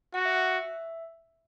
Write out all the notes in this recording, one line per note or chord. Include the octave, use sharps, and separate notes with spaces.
F#4 F#5
E5
E5